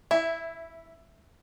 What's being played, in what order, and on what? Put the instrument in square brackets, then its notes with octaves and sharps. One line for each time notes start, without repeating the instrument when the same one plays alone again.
[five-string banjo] E4 [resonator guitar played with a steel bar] E5